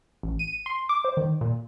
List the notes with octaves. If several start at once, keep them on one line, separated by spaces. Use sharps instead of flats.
A1
D#7
C6
D6
C5
D#3
A#2